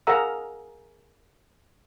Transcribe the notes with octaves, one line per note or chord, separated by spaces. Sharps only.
G#4 A#4 F5 F#5 A#5 E6